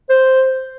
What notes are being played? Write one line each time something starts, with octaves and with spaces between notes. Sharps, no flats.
C5